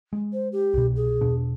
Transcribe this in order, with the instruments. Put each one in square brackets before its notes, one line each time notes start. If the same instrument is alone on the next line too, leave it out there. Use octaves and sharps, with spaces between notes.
[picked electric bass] G#3
[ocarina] C5
G4
[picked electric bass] C2 B2
[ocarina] G#4
[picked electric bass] E2 B2 D4